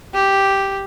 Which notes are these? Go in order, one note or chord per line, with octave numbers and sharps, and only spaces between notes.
G4